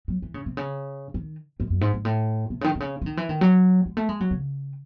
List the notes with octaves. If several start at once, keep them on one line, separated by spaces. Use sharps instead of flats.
F#3
E3
C#3
C3
C#3
D#3
F#2
F#2
G#2
G#2
A2
C3
C#3
D#3
C3
C#3
E3
D#3
E3
D#3
F#3
G#3
A3
G#3
F#3
C#3